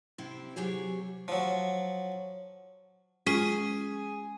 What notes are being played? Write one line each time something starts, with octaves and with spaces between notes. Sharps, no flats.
C3 C4 E4 G4
C3 F#3 G4 G#4 C#5
F3 F#3
G#3 C#4 F4 G#4